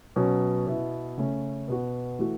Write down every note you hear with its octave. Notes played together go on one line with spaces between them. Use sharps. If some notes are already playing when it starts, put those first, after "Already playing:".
B2 F#3 C#4
B2 B3 E4
C#3 A3 C#4
B2 B3 F#4
E3 A3 F#4